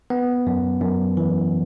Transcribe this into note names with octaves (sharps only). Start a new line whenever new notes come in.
B3
F#2
F#2
E3